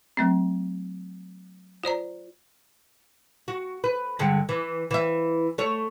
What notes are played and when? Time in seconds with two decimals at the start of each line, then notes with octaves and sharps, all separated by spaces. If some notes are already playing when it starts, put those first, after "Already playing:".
0.17 F#3 A3 C4
1.83 F4 C5 D5 A#5
3.48 F#4
3.84 B4
4.19 G2 D3 G#3
4.49 E3
4.91 E3 E5
5.58 A3 C#5